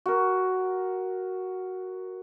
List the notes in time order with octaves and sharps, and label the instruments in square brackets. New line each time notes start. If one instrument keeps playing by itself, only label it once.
[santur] F#4 A#4